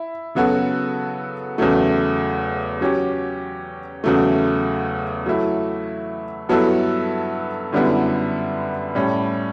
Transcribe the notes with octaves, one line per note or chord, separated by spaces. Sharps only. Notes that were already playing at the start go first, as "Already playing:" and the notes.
Already playing: E4
C#3 F#3 B3 F#4 A4
E2 C#3 F#3 A3
F#3 C#4 G4
E2 C#3 F#3 A3
F#3 A3 E4
G2 F#3 B3 E4 A4
F#2 D3 G3 B3 E4
A2 G3 C#4